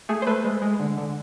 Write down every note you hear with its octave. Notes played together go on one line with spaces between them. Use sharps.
A3 G#4
C5
A3 B4
G#3
G#3
D3
D3